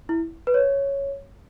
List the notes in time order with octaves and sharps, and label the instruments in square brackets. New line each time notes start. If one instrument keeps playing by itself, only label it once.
[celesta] E4
B4
C#5